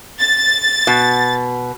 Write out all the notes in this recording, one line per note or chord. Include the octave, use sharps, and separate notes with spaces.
A6
B2